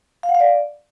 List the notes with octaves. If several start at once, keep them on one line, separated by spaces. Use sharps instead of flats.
F5
F#5
F5
D5